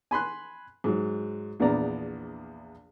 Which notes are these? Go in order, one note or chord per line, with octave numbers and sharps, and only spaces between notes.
G#5 B5 C6 F#6
G#2 F#3
A#1 E2 B3 D4 D5 A#5